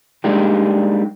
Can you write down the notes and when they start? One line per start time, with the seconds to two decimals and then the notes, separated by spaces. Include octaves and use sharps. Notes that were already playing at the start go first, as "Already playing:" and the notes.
0.24 G3 G#3 A#3 D4 D#4 G4